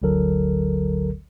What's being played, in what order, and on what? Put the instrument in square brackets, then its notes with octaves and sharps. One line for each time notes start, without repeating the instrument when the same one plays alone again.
[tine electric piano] G1 D2 D3 F#3 A4 A#4